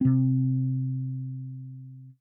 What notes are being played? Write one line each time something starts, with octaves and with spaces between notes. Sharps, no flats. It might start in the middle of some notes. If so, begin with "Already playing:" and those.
C3 C4